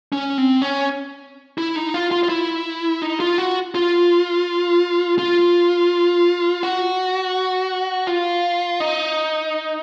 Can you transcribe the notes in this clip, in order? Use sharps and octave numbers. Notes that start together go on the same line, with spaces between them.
C#4
C4
C#4
E4
D#4
F4
F4
F4
E4
D#4
F4
F#4
F4
F4
F#4
F4
D#4